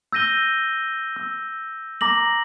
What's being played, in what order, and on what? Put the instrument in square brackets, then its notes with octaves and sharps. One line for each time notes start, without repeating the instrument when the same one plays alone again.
[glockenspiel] E6 G6 A#6 D#7 G7
E6
A#5 D6 A#6 F#7